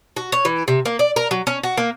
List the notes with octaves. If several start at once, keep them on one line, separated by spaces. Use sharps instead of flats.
F#4
C#5
E3
C3
A#3
D5
A#4
F#3
C#4
F#4
A#3